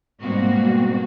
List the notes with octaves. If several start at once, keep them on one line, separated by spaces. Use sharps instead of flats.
G#2 B2 G3 A#3 C4 F#4